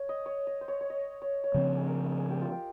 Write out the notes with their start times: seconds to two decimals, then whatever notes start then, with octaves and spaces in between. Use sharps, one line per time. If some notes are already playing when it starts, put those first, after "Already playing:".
Already playing: C#5
0.09 D#5
0.26 C#5
0.47 D#5
0.61 C5
0.68 C#5
0.81 C#5
0.90 D#5
1.22 C#5
1.44 C#5
1.54 C#3 F3 C4 C5
1.77 G#4
1.87 A#4
2.19 G#4
2.30 G4
2.42 F4
2.52 G4